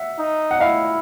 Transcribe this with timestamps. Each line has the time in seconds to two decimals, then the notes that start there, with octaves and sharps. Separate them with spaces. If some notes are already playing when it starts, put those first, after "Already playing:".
Already playing: E5 F#5
0.19 D#4
0.51 F#5
0.60 E4 D#5 F5